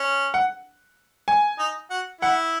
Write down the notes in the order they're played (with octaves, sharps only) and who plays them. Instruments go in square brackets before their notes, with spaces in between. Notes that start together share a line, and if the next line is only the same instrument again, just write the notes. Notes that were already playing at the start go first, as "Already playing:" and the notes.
Already playing: [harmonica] C#4
[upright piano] F#5
G#5
[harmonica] D#4
F#4
[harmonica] E4 [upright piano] F#5